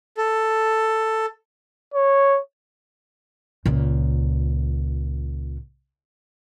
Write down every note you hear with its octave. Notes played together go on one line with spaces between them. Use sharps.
A4
C#5
C#2 A#2